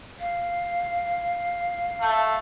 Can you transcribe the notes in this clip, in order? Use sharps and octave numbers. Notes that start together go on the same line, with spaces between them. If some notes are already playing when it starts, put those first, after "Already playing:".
F5
A3